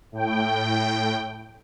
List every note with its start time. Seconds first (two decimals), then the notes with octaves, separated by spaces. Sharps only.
0.12 A2 G5